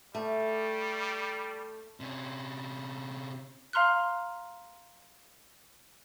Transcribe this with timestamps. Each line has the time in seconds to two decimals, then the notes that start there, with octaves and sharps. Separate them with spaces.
0.15 G3 A3
2.00 C3 C#4
3.73 F5 A#5 C6 F6 F#6